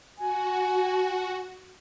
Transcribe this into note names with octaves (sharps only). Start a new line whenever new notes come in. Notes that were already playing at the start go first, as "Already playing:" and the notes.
F#4 G#5